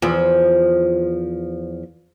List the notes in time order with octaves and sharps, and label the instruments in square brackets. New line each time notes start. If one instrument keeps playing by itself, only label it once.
[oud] E2 F3